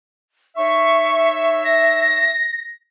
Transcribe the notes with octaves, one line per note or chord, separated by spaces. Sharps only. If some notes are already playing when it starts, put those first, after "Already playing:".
D#4 C#5 E5 C#6
A#6